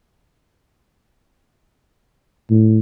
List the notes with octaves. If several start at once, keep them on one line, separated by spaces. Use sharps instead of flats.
A2